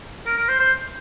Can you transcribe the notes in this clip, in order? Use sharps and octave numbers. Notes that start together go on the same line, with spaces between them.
A#4
A#4
C5
C5